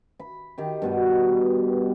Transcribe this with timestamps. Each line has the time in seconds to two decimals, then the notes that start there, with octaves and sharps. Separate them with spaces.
0.20 B5
0.58 D#3 G4
0.82 G2 B2 B3